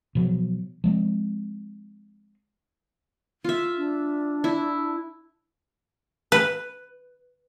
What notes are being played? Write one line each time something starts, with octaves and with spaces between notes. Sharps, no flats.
B2 F3 F#3
F3 G#3 C4
F4 E5
D4
E4
B4